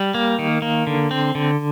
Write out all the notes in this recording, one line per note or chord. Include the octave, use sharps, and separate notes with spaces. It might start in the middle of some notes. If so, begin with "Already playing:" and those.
Already playing: G3
A#3
D#3
A#3
D3
C4
D3